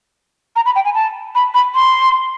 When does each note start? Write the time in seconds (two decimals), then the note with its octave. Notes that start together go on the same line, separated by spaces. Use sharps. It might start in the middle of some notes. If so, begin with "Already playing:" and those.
0.56 A#5
0.66 B5
0.75 G5
0.85 G#5
0.94 A5
1.35 B5
1.54 B5
1.75 C6